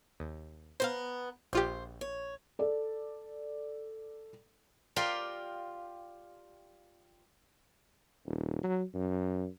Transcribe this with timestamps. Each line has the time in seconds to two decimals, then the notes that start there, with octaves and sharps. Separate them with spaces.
0.20 D#2
0.80 B3 C5 F5 A#5
1.53 A#1 F4 G4 C5
2.01 C#5
2.59 A4 D5
4.96 F4 G4 A#4 D5 F5
8.26 D#1
8.63 F#3
8.95 F#2